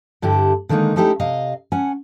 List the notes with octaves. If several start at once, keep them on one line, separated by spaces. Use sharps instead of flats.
G2 D3 E4 G4
D3 D#3 G#3 A#3 D#4
A3 C#4 D#4 E4 G4 A4
C3 D#5 F5
C#4 F#5 G#5